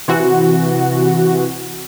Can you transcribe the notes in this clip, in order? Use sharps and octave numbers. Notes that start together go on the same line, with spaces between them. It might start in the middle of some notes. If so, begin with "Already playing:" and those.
C3 E3 F#4